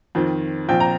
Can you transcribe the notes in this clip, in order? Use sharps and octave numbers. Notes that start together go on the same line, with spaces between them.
F2 D#3 C4
A#1 A#2 F3 C4 G5
A#5